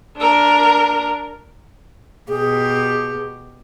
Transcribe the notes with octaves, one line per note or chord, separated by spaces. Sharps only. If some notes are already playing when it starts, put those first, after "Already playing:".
D4 A#4
B2 G4 G#4